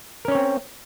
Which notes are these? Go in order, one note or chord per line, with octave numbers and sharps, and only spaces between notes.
C4 C#4 A#4 C#5